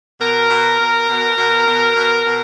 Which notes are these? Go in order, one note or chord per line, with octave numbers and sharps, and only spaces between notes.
B2 A#4
B2
B2
B2
B2
B2
B2
B2